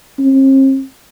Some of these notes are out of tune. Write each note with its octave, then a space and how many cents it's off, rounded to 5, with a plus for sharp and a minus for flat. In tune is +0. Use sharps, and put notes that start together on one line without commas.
C4 +45